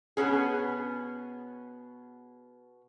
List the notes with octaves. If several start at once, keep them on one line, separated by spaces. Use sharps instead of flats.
B2 B3 C#4 G#4